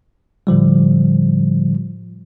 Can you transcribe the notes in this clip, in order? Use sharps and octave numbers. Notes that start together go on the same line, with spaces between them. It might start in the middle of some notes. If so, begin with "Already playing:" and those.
A2 D3 F3 G3